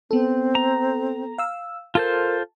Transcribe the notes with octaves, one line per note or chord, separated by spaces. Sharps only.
B3 C4 A4
A#5
F5 E6
F4 A4 A#4 C5 A5